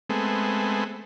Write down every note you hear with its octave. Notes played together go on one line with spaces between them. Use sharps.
G#3 A3 B3 C4